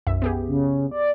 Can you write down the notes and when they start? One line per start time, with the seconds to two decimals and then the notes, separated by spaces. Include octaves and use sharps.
0.07 B1 F#2 E5
0.22 B3 G4 G#4
0.47 C#3
0.91 D5